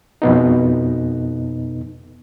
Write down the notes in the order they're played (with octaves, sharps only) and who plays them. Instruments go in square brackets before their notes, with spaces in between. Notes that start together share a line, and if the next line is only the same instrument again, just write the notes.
[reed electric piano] F2 B2 B3 D#4